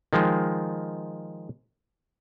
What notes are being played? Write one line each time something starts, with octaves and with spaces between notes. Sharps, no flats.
D#3 F3 G#3